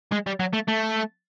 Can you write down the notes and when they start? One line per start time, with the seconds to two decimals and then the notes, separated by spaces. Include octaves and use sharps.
0.12 G#3
0.27 G3
0.40 F#3
0.53 A3
0.68 A3